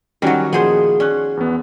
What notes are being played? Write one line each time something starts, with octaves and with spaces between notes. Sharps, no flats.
D#3 F#3 G3 C#4 F#4
A#2 F3 B3 G#4 C5
C#4 D5 F#6
E2 B3